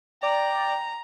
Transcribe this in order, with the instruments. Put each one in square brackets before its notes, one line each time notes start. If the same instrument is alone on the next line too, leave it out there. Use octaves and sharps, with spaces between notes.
[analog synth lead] D5 [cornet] G5 [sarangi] A#5